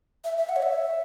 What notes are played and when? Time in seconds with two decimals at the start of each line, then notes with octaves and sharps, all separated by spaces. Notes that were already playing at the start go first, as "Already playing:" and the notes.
0.25 E5
0.37 E5
0.49 F#5
0.56 C#5
0.62 E5